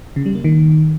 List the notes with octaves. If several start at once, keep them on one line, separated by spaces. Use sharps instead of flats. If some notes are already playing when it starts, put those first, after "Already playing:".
C#3
G3
A#3
D#3